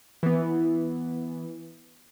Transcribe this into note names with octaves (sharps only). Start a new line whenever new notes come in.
E3 B3